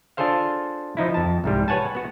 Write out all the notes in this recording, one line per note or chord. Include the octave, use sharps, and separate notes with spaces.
D4 F4 G#4 A4 C5 F5
F3 D#4 E4
F2 A5
C2 G#2 G3
B4 C#5 F#5 G#5 A5
B3 F#4